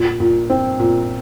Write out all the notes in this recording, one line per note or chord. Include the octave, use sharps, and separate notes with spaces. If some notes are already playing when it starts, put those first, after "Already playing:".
Already playing: A#2
A#2
C4
A#2